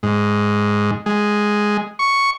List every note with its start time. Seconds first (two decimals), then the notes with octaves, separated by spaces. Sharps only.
0.03 G#2
1.06 G#3
1.99 C#6